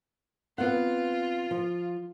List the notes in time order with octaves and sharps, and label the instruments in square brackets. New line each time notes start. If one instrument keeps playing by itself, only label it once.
[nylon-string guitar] B3 C4 F#5 [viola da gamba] F4
[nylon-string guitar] F3